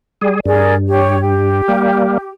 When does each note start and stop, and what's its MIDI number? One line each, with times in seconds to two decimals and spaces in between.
0.21 0.40 55
0.21 0.40 68
0.46 1.62 43
0.46 0.74 68
0.46 0.74 70
0.46 0.74 74
0.87 1.18 67
0.87 1.18 73
1.20 2.30 67
1.68 2.18 55
1.68 2.18 58